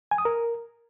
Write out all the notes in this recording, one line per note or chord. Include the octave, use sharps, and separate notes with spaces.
G#5
D#6
A#4